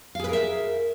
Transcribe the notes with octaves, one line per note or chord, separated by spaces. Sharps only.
G#4 A#4 B4 E5 F5